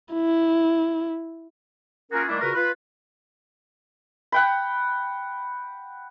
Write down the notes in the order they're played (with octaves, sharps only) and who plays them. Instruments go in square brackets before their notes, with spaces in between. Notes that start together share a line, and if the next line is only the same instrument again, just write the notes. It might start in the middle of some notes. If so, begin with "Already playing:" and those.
[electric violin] E4
[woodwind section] A#3 C#4 F4 F#4 G#4 A#4
D#3 G3 A3 A#3 D4 E4
A#2 C#3 F#4 A#4 B4
F4 B4
[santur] F#5 G5 B5